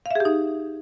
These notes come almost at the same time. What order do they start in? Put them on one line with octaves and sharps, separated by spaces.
F5 E5 G#4 G4 D#4